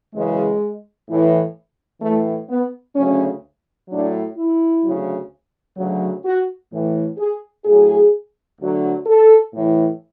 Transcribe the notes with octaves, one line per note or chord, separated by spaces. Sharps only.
F#2 C#3 E3 G#3
A2 E3
A2 E3 A3
B3
D2 C#3 F#3 C#4
A2 F#3 D4
E4
D2 C#3 F#3
D2 C#3 F#3
F#4
A2 E3
G#4
A2 F#3 G#4
D2 D3 F#3
A4
A2
E3